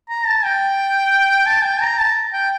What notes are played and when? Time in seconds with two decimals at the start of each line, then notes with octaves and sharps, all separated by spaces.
0.09 A#5
0.26 A5
0.45 G5
1.46 A5
1.64 G5
1.81 A#5
1.98 A5
2.33 G5